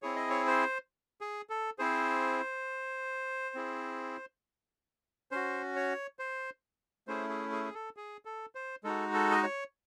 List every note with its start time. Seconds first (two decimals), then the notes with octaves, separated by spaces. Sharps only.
0.02 C4 E4 G#4 C#5
0.16 D#5
0.30 C#5
0.47 C5
1.21 G#4
1.50 A4
1.79 C4 E4 G#4 C5
3.55 C4 E4 G#4
5.31 C#4 F#4 C5
5.76 C#5
6.19 C5
7.07 A3 C#4 E4 G#4 C5
7.30 G#4
7.52 G#4
7.65 G#4
7.74 A4
7.97 G#4
8.25 A4
8.55 C5
8.84 G#3 D#4 F#4 A4
9.14 A4
9.31 D#5
9.43 C#5